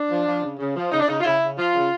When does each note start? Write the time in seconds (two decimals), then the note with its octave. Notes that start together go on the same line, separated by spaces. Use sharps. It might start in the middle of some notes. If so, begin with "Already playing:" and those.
Already playing: D4
0.10 F3
0.26 F3
0.43 C#3
0.59 C#3
0.76 F3
0.92 C#3 D#4
1.00 D4
1.08 C#3 D#4
1.21 F4
1.25 C#3 E4
1.42 C#3
1.58 F3 F4
1.74 C#3